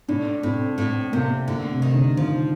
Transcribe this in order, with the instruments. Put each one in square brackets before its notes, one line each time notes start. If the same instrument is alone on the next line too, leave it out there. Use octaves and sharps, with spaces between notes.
[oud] A2 [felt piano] D4
[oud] A2 [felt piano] C4
[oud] A2 [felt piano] C4
[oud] C3 [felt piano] A#3
[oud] D3 [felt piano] A3
[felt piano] C3
[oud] D#3
[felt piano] D3
[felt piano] D#3 [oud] F3